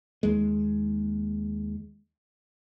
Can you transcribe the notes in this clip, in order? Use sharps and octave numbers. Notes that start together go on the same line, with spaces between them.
D#2 G#3